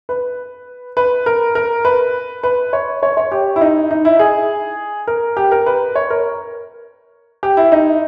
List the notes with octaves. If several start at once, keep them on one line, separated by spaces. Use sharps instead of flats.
B4
B4
A#4
A#4
B4
B4
C#5
C#5
C#5
G4
E4
D#4
D#4
E4
G#4
A#4
G4
A#4
B4
C#5
A#4
G4
E4
D#4